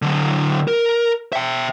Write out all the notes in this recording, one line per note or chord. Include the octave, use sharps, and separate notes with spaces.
D3 F#3
A#4
E5 G5